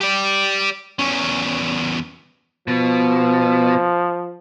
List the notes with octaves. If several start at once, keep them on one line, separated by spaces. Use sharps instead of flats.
G4 D5
E2 C#4
B2 F3